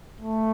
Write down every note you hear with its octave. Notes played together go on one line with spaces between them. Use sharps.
A3